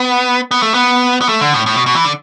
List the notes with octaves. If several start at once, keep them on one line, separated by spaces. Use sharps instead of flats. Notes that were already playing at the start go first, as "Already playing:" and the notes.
Already playing: B3
B3
A3
B3
B3
A3
D3
A2
A2
B2
B2
E3
D3